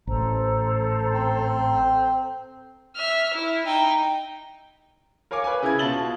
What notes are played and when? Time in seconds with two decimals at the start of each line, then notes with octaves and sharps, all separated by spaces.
0.07 A1 A4 C5 A#5
1.14 C4
2.96 E5 F6
3.34 E4
3.66 D#4 G5
5.31 A#4 C#5 F5 G#5 D6
5.44 B4 G#5
5.63 C#3 E4 G#6
5.79 B2 F4 A5 A6 F#7 G7